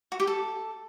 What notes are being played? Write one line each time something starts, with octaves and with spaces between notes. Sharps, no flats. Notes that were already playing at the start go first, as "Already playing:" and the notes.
F#4
G4
A4